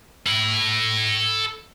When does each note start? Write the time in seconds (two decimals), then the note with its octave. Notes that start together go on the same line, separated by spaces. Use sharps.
0.26 A4 B5